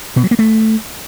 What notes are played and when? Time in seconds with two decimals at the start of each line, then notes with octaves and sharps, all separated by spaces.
0.16 B2
0.24 F#3
0.31 A#3
0.39 A3